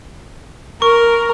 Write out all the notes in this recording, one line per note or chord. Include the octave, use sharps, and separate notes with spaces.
A#4 C#6